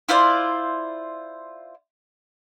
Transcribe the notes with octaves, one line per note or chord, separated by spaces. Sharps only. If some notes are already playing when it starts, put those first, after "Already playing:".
E4 F4 C5 D5